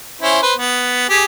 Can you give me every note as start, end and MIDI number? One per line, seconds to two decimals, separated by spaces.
0.22 0.40 61
0.22 0.40 64
0.22 0.40 72
0.43 0.54 71
0.43 0.54 72
0.57 1.05 59
1.09 1.25 67
1.09 1.25 68